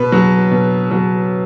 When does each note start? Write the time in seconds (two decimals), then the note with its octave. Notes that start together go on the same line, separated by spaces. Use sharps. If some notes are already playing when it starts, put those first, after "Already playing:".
Already playing: B2 B4
0.12 F#3
0.51 B2
0.91 F#3